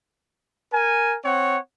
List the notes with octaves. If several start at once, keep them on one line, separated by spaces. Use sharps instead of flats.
A#4 G#5
C4 C#5 F#5